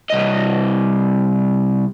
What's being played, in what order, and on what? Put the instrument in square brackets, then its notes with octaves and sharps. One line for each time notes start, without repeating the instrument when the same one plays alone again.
[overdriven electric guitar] C2 D#5